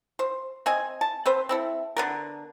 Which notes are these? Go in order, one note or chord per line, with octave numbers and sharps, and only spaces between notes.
C5
C4 D#5 G#5
A5
C4 B4 C5
C4 E4 A4
D3 B3 A#4